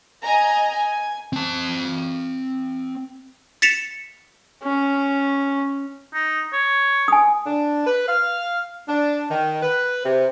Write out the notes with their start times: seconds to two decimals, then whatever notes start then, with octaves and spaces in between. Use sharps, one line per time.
0.23 D#5 G#5 A#5
0.73 G#5
1.33 C4 A5
3.62 A6 B6 C#7 E7 F7
4.63 C#4
6.14 D#4
6.53 C#5
7.08 G#5 D#6
7.46 D4
7.87 B4
8.08 F5
8.88 D4
9.30 D#3
9.62 B4
10.05 C3